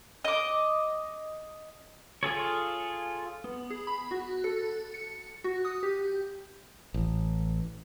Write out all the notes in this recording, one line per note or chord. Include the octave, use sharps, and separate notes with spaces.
D#5 D6
F4 G#4 A4 C#5
B3
G#4
B5
F#4
A4
C#7
F#4
D#6
G4
A1